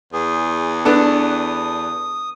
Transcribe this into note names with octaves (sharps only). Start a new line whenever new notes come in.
E2 G#4
B3 D4 A4 D#6